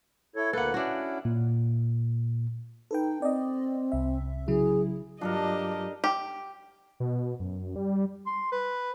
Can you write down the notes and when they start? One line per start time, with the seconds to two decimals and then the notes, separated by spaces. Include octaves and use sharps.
0.36 E4 A4 C#5
0.53 D2 A#3 A4 B4 F#5
0.74 C#4 D4 E4 F#4
1.25 A#2
2.91 D#4 A4 B4 G5
3.22 C4 D5 D#5
3.92 C2 E5
4.48 C#3 F#3 E4 G#4
5.21 G2 F#3 D4 F4 G4 A4 A#4 D#5
6.04 G4
7.00 B2
7.40 F#2
7.76 G3
8.26 C6
8.52 B4